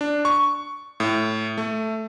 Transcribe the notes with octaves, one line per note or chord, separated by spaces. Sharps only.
D4
C#6
A2
A3